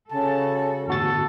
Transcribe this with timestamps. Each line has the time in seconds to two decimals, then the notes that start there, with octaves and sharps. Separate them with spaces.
0.11 C#3 G3 F#4 A4 A5
0.88 G1 E2 A2 E3 F#4 A4 A6